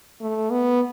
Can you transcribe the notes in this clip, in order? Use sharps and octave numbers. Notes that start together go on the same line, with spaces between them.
A3
B3